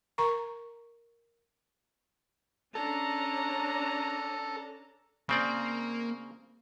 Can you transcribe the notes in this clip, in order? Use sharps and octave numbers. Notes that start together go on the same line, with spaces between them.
A#4 A#5 C#6
C#4 D4 A4 A#5
C#3 A#3 C4 D5